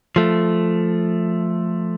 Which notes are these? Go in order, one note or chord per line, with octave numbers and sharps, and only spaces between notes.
F3 A3